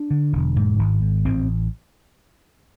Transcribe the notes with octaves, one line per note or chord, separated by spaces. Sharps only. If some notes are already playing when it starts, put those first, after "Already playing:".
Already playing: D4
D3
E1
G#2
G#1
G#2
A1 C4